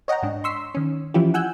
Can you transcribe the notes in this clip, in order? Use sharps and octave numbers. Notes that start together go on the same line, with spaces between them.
C#5 D#5 F#5 G5 A#5
G#2 D4
C6 C#6 E6 B6 C7
D#3 C#4
E3 F3 C#4 E4 F4 G4
F#5 G#5 E6 F#6 G6